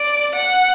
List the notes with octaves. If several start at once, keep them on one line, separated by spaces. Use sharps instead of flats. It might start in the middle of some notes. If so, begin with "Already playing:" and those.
Already playing: D5
F#5